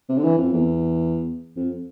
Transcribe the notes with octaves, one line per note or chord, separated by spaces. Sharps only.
C3
D3
E3
F2
E2
F2